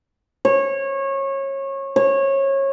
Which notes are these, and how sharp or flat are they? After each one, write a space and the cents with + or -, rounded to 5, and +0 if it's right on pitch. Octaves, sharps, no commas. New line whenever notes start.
C#5 -25
C#5 -25